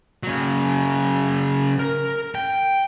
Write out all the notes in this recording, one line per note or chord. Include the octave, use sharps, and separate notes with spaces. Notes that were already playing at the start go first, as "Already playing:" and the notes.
C#3 F#3
A#4
G5